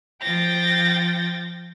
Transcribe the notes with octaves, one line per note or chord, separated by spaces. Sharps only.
F3 G5 A6 A#6